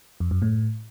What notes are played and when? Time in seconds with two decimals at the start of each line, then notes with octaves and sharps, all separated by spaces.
0.20 F2
0.31 F#2
0.42 A2